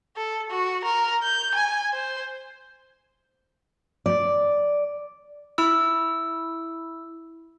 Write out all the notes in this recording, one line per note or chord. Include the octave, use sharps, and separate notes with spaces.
A4
F#4
A#4
G6
G#5
C5
D5
E4 E6